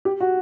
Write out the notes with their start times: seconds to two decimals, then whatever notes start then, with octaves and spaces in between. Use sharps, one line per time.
0.05 G4
0.20 F#4